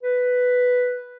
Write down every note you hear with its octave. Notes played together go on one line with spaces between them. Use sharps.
B4